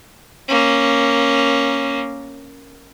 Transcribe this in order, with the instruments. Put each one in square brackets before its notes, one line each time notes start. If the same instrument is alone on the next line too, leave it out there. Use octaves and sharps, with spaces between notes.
[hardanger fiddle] A#3 C#4